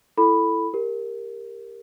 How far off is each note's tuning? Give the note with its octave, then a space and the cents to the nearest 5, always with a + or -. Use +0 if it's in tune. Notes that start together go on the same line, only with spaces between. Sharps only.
E4 +20 A4 +0 B5 +0
G4 +25 A#4 +0